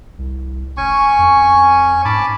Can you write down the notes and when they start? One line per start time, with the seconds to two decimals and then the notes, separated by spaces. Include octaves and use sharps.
0.18 C2
0.77 F1 C#4 G#5 C#6
1.18 F2
2.05 G#2 A5 B5 D6